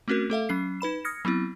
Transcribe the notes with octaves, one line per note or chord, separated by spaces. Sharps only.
A3 C4 C#4 F#4 A#4
A3 A4 E5 F5
F#3 C#4 C7
D#4 B4 B5 E7
D#6 F6 G#6 A#6 C#7
F#3 B3 C4 E4